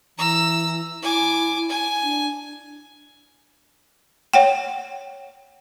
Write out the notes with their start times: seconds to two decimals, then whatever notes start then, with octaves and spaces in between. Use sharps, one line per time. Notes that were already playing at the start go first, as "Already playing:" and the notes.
0.18 E3 A#5 E6
1.02 E4 G#5 D6
1.69 G#5
2.03 D4
4.33 C#5 F#5 G5